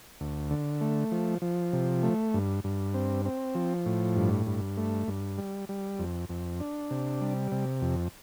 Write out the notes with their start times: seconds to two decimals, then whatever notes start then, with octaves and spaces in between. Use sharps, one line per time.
0.20 D2
0.51 D3
0.81 A3
1.11 F3
1.42 F3
1.73 C3
2.03 A3
2.34 G2
2.64 G2
2.94 C4
3.25 C4
3.55 F3
3.86 A2
4.16 G2
4.46 G2
4.77 A3
5.08 G2
5.38 G3
5.69 G3
5.99 F2
6.29 F2
6.60 D4
6.91 C3
7.21 G3
7.52 C3
7.82 F2